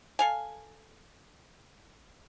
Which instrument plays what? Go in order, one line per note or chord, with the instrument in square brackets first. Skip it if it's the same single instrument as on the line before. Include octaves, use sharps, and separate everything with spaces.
[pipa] A4 F5 G#5